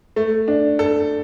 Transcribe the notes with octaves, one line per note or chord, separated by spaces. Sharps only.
A3
D4
A4